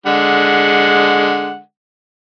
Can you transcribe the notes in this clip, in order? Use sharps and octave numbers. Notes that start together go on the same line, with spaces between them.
D3 G#3 F#5